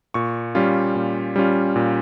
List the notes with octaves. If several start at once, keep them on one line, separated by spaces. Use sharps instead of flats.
A#2 C#6
G3 C#4 F4
A#2
G3 C#4 F4
A#2